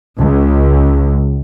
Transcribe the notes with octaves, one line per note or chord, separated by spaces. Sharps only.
C#2